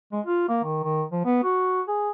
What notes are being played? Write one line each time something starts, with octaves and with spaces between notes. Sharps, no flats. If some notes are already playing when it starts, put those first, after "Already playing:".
G#3
F4
A#3
D#3
D#3
F3
B3
F#4
G#4